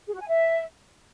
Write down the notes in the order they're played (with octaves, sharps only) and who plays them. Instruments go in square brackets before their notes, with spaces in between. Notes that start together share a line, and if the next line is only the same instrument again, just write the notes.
[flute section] G#4
F#4
G#5
E5